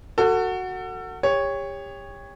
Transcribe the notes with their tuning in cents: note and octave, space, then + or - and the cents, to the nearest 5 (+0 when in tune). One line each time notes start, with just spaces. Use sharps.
F#4 +0 A4 +30
G4 +35 C#5 +0